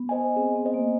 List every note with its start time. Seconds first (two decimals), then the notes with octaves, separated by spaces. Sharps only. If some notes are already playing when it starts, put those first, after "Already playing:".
Already playing: B3
0.09 C5 D#5 G#5
0.36 C4 G#4
0.56 B3
0.65 C5 D#5 G#5
0.74 A#3